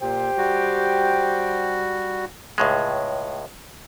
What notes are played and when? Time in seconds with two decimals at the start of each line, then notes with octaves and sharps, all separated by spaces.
0.01 A#2 G4 C5 G5
0.37 G3 F#4
2.58 C#2 A2 G#3